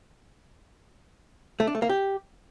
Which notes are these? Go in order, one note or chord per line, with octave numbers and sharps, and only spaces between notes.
A3
D4
A3
A#3
G4